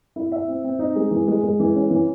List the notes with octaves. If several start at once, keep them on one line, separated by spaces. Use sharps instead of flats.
E4
E5
C4
C4
D#4
G#3
E3
G#3
G#3
E3
C#4
E3